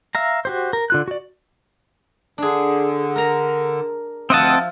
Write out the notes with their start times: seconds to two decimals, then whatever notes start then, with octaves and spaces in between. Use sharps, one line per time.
0.15 E5 F5 A#5
0.45 F#4 G4 C5
0.73 A#4
0.90 D3 F4 F#6
1.08 F#4 D5
2.38 D3 D4 G#4
3.16 A#4 A#5
4.30 D2 F3 C4 D#5 E5 F#5 A5 D#6